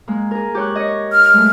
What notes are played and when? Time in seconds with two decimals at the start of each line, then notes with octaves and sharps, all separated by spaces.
0.08 G#3 A#3
0.31 G#4 A#4
0.55 G4 C#5 F#6
0.75 C#5 D#5
1.12 F6
1.33 G#3 A3